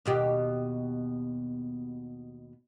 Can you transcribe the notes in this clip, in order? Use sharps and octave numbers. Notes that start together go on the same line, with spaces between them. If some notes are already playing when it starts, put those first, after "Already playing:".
D#2 B2 G4